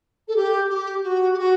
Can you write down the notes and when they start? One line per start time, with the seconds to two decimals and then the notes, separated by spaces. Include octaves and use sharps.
0.28 A4
0.35 G4
0.70 G4
1.03 F#4
1.34 G4
1.38 F#4